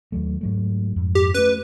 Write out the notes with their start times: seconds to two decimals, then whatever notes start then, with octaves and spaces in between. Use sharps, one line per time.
0.12 D#2 F#3 A3
0.41 G#2 F#3 A3
0.96 F2 G#2
1.15 G4
1.34 A3 C#4 B4